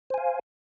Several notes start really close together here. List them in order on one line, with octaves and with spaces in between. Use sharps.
C5 G#5 F5